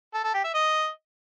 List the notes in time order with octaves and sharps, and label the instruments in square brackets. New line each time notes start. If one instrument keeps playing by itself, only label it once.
[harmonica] A4
A4
G4
E5
D#5